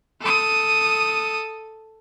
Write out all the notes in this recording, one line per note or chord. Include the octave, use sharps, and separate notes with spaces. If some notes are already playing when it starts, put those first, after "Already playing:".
A4 D#6